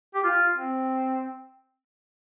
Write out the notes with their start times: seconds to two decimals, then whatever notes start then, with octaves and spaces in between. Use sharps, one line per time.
0.15 G4
0.24 F4
0.56 C4